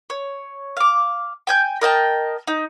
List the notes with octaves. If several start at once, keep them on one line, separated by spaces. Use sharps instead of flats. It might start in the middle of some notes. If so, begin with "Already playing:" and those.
C#5
F5 D6
G5 G#5 G6
A#4 D#5 G5 A5
D#4